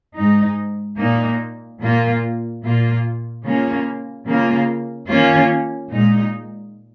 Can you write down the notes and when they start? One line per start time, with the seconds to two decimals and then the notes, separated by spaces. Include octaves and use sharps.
0.18 G#2 G#3 D#4
0.99 A#2 A#3 D#4
1.81 A#2 A#3 F4
2.64 A#2 A#3 F4
3.45 C#3 A#3 C#4 F4
4.27 C#3 A#3 F4
5.09 D#3 A#3 C#4 F4
5.91 A#2 G#3 D#4